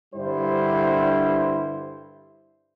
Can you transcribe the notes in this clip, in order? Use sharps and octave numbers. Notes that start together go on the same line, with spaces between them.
G2 D3 G3 E4 C5